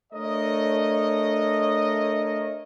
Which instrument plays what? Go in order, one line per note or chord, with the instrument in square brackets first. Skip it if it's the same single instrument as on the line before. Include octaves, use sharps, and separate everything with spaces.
[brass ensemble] A3 D4 A#4 C#5 D#5